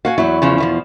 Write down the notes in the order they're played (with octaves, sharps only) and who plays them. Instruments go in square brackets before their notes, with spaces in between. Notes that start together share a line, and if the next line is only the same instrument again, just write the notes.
[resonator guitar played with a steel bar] F#4 [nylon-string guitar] F5 F#5 G#5
[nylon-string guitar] E2 E4 [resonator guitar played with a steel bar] F#3
[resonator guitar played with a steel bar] C#3 F3 C#4
B2 E3 F3